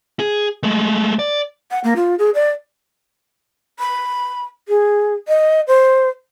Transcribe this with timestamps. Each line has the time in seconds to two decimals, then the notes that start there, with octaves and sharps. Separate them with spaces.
0.20 G#4
0.63 G#3 A3
1.19 D5
1.71 F#5
1.84 A#3
1.96 F4
2.19 G#4
2.34 D5
3.80 B5
4.68 G#4
5.28 D#5
5.68 C5